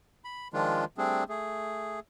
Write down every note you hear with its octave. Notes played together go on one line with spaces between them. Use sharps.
B5
D#3 F3 G#3 D4 F4
G3 A3 C4 D4 G#4
A3 G#4